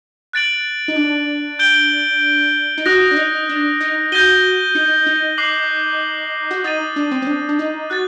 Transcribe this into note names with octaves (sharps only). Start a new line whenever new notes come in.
F#6 A6 D7 F#7
D#4
D4
G6 D7 G7
D#4
F#4 D#6 F#6 A#6
D4
D#4
D4
D#4
F#4 G6 A#6 D#7 G7
D#4
D#4
D6 F#6 C7 F#7
F#4
D#4 D#6 A6 D#7
D4
C4
C4
D4
D4
D#4
F#4 F#6 A6